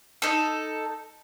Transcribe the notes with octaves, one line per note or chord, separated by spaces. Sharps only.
D#4 A4